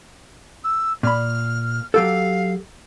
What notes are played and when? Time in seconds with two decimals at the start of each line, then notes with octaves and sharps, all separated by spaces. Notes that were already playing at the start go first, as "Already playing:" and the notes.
0.63 E6
1.03 A#2 B5 F6
1.94 F#3 G4 A4 F5